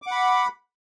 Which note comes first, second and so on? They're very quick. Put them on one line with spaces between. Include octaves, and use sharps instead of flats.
D6 F#5 B5